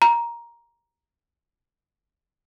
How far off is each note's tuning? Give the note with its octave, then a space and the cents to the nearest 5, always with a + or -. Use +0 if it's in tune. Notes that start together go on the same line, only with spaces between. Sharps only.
A#5 +10